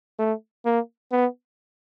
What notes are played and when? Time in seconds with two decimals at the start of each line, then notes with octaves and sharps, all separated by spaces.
0.19 A3
0.65 A#3
1.12 B3